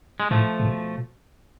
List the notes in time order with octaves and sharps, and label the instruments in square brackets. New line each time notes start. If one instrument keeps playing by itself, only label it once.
[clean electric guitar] G#3
[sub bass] A2 [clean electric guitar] F3 A3
[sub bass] A2
B2